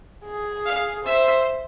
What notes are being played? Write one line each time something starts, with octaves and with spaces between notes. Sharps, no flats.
G#4
F5
C5 E5